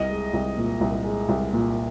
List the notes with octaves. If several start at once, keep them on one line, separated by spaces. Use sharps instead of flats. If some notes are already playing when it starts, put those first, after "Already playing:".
Already playing: C2 D#5
G#3
C2
A#2
C2
G#3
C2
A#2